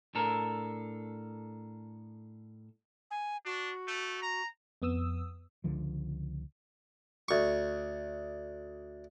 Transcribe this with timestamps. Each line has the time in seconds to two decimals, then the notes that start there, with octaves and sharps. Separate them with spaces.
0.15 A2 D4 A4 A#4
3.11 G#5
3.45 D4 F#4
3.87 A3
4.22 A#5
4.82 F2 B3 D#6 E6
5.64 C#2 D3 F3
7.28 D2 C#6